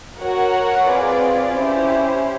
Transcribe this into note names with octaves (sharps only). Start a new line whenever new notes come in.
F#4 A#4 C#5 F#5
C4 F4 G#4 B4 D5
C#4 E4 G4 C5